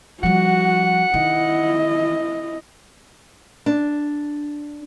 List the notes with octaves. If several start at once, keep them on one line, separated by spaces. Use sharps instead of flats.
F3 G3 F#4 F#5
D#3 E4 D#5
D4